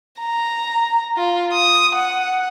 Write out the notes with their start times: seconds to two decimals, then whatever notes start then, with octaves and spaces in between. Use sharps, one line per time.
0.21 A#5
1.17 F4
1.53 D#6
1.96 F#5